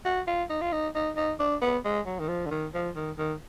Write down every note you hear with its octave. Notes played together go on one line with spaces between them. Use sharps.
F#4
F4
D#4
F4
D#4
D#4
D#4
D4
B3
G#3
F#3
D#3
F3
D3
D#3
F3
D#3
D#3